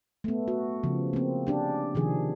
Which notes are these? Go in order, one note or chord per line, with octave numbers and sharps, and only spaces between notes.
A3 B3
F#4
C#3 F3
A#3 C4
C#4 D4 G4
C3 D#3 F3 G#4